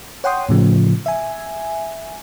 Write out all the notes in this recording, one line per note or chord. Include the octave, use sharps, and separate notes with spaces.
C#5 F#5 G5 C6 D#6
A2 C#3 F3
E5 G#5